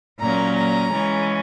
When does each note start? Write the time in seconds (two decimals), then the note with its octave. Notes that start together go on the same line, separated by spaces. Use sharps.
0.20 A#2 F#3 A#3 C#4 A#5
0.56 A#5
0.91 C#3 E3 G#3 C#4